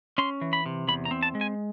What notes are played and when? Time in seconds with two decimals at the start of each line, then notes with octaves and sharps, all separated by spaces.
0.18 C#4 C6
0.41 E3
0.53 B5
0.66 C3
0.88 E2 B5
1.05 A#5
1.11 C4
1.23 A5
1.35 G#3
1.41 G#5